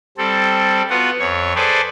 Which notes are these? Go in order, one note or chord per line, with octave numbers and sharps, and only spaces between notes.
G3 C4 A4
B3 F4 F#4 F#5
F2 C#5
G#4 A4 B4 C5 D5